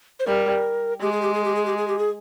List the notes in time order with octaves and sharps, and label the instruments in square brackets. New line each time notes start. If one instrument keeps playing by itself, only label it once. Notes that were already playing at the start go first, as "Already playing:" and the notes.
[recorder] C5
[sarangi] G3 [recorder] A#4
[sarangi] G#3 [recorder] G4
[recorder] G#4
G4
G#4
G4
G#4
G4
G#4
G4
G#4